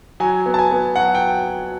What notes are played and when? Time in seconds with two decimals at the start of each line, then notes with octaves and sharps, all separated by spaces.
0.20 F#3 G#5
0.46 B3
0.54 A5
0.59 G#5
0.71 B3
0.96 F#3 F#5
1.15 G5